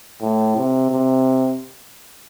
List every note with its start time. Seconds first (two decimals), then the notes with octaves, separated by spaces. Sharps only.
0.22 A2
0.57 C3
0.91 C3